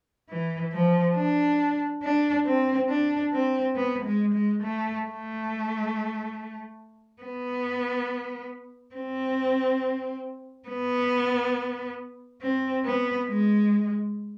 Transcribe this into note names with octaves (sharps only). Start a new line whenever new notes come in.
E3
F3
D4
D4
C4
D4
C4
B3
G#3
G#3
A3
A3
B3
C4
B3
C4
B3
G#3